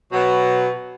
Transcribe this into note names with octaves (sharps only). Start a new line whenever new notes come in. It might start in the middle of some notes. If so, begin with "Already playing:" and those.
B2 F#3